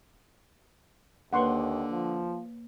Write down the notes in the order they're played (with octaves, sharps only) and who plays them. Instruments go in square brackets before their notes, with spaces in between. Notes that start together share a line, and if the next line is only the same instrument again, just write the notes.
[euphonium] D#2 [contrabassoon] D3 [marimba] A#3 B4 C#5 [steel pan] F#5 C6 C#6
[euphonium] F3